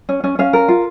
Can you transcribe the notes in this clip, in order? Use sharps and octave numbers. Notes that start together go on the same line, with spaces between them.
C#4
C#4
C#4 F5
A#4
F4